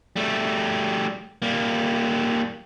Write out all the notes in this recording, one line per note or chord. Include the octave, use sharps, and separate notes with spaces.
G3 A3
G3 A#3